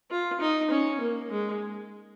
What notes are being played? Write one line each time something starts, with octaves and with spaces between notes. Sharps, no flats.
F4
D#4
C#4
A#3
G#3